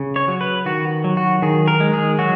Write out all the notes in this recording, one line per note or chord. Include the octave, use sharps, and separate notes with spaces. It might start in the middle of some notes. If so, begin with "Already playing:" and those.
Already playing: C#3
C#5
F#3
B4
D#3 F#4
F#3
F#4
D#3 G#4
A#4
G#3
G#4
F#3 F#4